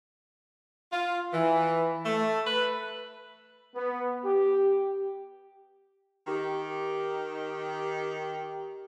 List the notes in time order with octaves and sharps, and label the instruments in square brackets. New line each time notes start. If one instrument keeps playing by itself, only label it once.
[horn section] F4
E3
A3
B4
[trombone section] B3
G4
[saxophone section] D#3 G4